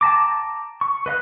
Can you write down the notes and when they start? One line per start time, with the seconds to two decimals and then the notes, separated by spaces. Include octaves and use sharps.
0.01 G5 A5 A#5 D6
0.81 C#6
1.06 B4 D#5 F5 F#6